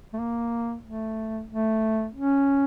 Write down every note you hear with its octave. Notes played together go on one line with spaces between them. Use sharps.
A3
A#3
A3
A3
C#4